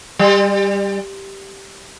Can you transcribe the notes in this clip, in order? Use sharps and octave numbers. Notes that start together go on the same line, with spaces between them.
G3